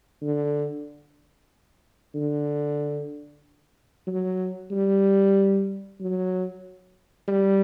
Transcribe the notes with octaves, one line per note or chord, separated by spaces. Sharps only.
D3
D3
F#3
G3
F#3
G3